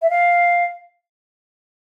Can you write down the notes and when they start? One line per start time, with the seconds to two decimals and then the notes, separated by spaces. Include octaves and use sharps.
0.02 E5
0.10 F5